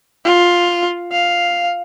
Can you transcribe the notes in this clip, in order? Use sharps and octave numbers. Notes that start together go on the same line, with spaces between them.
F4
F5